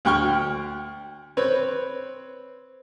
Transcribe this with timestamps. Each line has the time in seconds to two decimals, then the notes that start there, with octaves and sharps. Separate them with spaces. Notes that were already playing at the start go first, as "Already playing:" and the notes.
0.05 D2 G5 C#6 F6
1.37 C4 B4 C#5